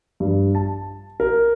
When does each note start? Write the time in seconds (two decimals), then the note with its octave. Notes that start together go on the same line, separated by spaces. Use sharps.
0.20 G2
0.55 A5
1.20 A#4